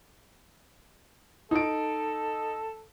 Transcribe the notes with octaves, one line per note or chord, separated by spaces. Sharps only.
D#4 A4 D7